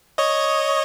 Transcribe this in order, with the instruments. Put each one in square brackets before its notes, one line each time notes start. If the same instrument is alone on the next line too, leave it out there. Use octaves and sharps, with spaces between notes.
[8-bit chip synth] C#5 D#5